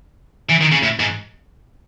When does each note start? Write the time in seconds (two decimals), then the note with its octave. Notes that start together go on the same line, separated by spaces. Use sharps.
0.50 E3
0.61 D#3
0.72 C#3
0.83 A2
1.00 G#2